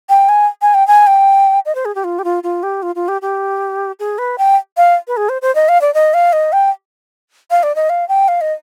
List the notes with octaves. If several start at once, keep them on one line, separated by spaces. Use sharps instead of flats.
G5
G#5
G#5
G5
G#5
G5
D#5
C5
G#4
G4
F4
G4
F4
F4
G4
F4
F4
G4
G4
G#4
B4
G5
F5
B4
G#4
C5
C5
D#5
F5
D5
D#5
F5
D#5
G5
F5
D5
D#5
F5
G5
F5
D#5